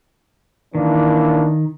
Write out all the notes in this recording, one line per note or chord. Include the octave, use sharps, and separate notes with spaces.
D#3 E3 A#3 D4